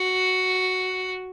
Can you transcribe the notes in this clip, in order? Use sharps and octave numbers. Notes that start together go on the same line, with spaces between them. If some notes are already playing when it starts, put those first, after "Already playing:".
Already playing: F#4